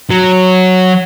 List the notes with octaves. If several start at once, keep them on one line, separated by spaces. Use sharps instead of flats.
F#3